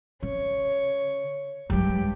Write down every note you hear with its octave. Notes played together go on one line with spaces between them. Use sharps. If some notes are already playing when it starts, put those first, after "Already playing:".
C#3 C#5
G2 F#3 G#3 G4